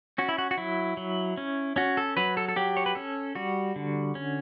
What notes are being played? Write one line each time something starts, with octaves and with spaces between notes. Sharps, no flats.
C#4 F#4
E4
F#4
F#4
F#3 E4
F#3
C#4
C#4 F#4
A4
F#3 B4
A4
A4
F#3 G4
C#5
B4
C#4 A4
G3 F#4
D3
C#4